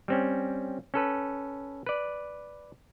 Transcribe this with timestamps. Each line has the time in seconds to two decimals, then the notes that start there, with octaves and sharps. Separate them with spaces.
0.08 G3 C4 C#4
0.94 C#4 A4 B4
1.86 B4 D5